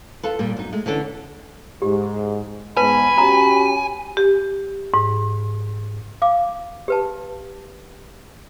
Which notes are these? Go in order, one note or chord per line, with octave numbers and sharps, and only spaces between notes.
F4 A4 B4
A#2 G3
F#2 D#4
G#3 A3
D3 E3 C#4 D4 A4
G#2 G4
G#2 B3 B4 G#5 A5 B5
C#4 F#4 G4 A#5
G4
G#2
F5 D6
G4 B4 A5